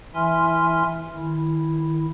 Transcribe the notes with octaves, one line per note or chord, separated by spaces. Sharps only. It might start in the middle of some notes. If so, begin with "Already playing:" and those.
E3 E4 E5 G#5 C6 F6
D#3 E4